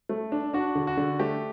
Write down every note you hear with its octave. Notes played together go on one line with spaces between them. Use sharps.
A3
D4
D4 F#4
D3
F#4
D3
A3 G4